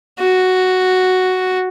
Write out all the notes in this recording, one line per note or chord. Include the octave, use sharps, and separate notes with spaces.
F#4